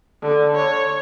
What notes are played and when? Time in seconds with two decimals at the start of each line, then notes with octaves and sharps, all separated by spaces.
0.22 D3
0.56 C#5